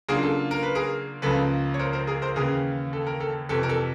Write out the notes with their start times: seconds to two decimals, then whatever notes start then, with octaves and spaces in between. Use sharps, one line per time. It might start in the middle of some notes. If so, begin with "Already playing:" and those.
0.08 C#3 F#3 A#3 D4 F4 G#4 A#4
0.23 A4
0.51 A#4
0.63 B4
0.75 G#4 A#4
1.22 C#2 C#3 F3 A#3 A4 B4
1.74 C#5
1.79 A#4 C5
1.93 A#4 C5
2.07 G#4 A#4
2.22 A#4 C5
2.36 D#2 C#3 E3 G#4 A#4
2.93 A4
3.07 A#4
3.20 A4
3.49 F2 C3 E3 A4
3.63 A#4
3.69 A4